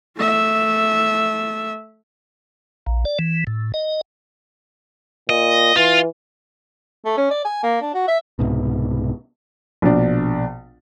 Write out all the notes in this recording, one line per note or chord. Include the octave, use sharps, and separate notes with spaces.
A3 E5
A#1
D5
E3
A2
D#5
A#2 D#5
E3 F4
A3
C#4
D5
G#5
A#3
D4
F#4
E5
C2 G#2 B2
A#1 B2 D4